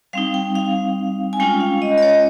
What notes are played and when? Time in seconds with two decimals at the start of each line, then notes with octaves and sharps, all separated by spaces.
0.13 G3 C4 D#4 F5
0.34 G5
0.55 F5
1.33 G#5
1.40 G#3 C#4 F4 G5
1.61 F5
1.82 D#5
1.98 D#5
2.03 C#5